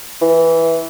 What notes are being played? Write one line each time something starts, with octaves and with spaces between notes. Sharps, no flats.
E3